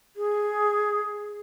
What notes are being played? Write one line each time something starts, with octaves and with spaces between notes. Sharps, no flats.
G#4